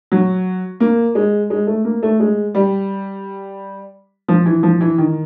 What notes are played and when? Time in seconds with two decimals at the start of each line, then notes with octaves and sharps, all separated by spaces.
0.12 F#3
0.80 A#3
1.15 G#3
1.50 G#3
1.67 A3
1.85 A#3
2.03 A3
2.20 G#3
2.55 G3
4.28 F3
4.46 E3
4.63 F3
4.81 E3
4.98 D#3